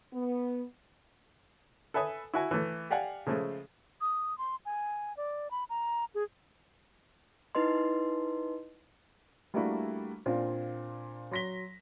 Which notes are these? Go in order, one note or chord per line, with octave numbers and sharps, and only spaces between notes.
B3
A4 B4 E5 G#5 D#6
E4 F#4 G#5
E3 A3
G4 D5 F5 F#5 G#5
C#3 F3 G#3 A3
D#6
C6
G#5
D5
B5
A#5
G#4
D#4 E4 B4 D#5 C6
G3 A3 A#3 D4 E4 F#4
A#2 C4 D4 F4
F#3 C6 A#6 B6 G7